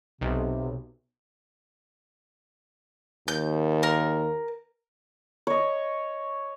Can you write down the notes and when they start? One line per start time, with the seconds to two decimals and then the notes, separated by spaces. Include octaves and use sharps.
0.21 B1 C3
3.28 D#2 G6
3.83 A#4
5.47 C#5 D#5